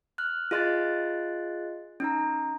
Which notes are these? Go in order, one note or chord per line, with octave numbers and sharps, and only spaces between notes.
F6 F#6
F4 G#4 D#5 C6 F#6 A6
C#4 D#4 A#5